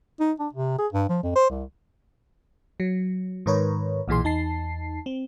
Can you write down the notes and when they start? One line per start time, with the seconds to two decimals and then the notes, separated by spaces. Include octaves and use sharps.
0.20 D#4
0.40 D4
0.53 C3
0.78 G#4
0.93 G2
1.09 F3
1.23 F2
1.35 C5
1.50 C2
2.80 F#3
3.46 G#2 D#3 A#4 B4 C#5
4.08 B1 A#2 E3 G#4 C6
4.24 E2 D#4 A5 C7
5.06 C4